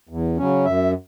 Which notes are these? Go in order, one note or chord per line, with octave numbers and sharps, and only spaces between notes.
E2
C#3 F#3 C#4
F#2 E5